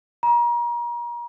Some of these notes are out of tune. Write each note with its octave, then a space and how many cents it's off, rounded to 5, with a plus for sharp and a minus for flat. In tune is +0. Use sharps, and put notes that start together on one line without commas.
A#5 +35